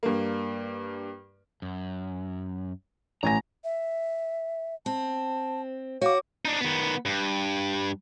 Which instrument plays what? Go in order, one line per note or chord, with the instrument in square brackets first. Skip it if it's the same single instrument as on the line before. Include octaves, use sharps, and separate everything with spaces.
[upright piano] G2 A#3
[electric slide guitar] F#2
[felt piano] A1 G#5 A#6 [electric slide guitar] A#5
[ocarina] E5
[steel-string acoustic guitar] C4 [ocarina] A5
[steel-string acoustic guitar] F#4 [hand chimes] C#5 D6 [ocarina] F5
[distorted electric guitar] D4 D#4
D#3 B3
G2